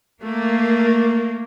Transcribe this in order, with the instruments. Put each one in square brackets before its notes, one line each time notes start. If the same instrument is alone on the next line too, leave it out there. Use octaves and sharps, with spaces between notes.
[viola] A3 [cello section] A#3